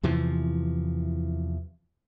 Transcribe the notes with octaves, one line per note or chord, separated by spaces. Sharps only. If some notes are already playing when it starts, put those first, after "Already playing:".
E2 C3 E3 F3